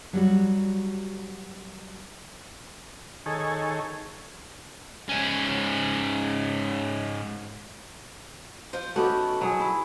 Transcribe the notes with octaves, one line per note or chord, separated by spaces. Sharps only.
F#3 G3 F#4
D#3 G#4 A4 C#5
G#2 C#4
F3 C5
D#3 A3 B3 C#4 F#4 G4
F#3 G#4
E4